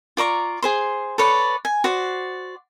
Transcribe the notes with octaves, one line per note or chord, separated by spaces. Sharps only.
F4 D5 A#5 C#6
G#4 C5 C6
A4 B4 C#5 D5
G#5
F#4 C5 D5